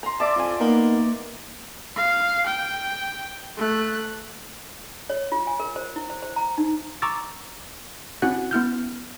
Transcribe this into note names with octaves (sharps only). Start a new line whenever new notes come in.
A#5 C6
D5 E5 A5 D6
F2 F4 G#5
A#3 B3 D#4 A#4
F5
G5
A3 F#6
C#5
F4
G#5
A#4
C5
E4
C5
C5
A#5
D#4
A#5 C#6 D6 E6 A6
C4 C#4 E4 F#4 F#5 F#6
B3 E4 F6 G6